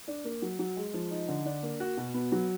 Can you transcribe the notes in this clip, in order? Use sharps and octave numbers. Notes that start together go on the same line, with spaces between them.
D4
A#3
F#3
F#3
G#3
F3
D#4
D3
D4
A#3
F#4
B2
B3
F#3